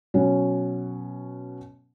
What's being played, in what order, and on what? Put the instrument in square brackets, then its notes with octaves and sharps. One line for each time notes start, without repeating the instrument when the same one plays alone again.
[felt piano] B2 F#3 C#4